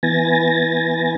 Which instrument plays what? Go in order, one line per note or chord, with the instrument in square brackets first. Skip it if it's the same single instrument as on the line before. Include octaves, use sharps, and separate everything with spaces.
[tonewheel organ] E3 B3 G#5 A6 A#6